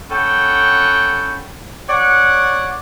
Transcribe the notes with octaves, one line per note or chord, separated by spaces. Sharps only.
C#4 A4 F#5 G5 B5
C#5 D5 F#5